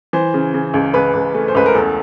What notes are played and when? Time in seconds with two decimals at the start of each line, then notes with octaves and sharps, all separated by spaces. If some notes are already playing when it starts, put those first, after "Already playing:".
0.13 E3 C5
0.34 C#3
0.54 C#3
0.74 C#2
0.94 C#2 B4
1.14 C#2
1.35 A3
1.48 C5
1.55 C#2 B4
1.66 A#4
1.75 E2 A4